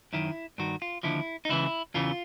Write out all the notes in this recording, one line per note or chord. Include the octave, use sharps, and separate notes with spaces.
F#2 D#3 E4
G2 D#3 F#4
F4
D#2 D3 F3 E4
D#4
C#2 C#3 E3 E4
E2 C#3 E3 F4